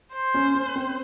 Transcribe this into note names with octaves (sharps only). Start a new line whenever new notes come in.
C5
C#4
C#4
C4